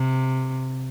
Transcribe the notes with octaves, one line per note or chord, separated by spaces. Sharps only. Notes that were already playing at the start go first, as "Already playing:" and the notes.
Already playing: C3